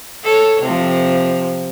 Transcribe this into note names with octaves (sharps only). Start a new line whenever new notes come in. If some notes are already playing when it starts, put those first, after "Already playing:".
A4 C#5
C3 F3